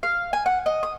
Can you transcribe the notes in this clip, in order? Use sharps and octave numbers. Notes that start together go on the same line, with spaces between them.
F5
G#5
F#5
D#5
D#6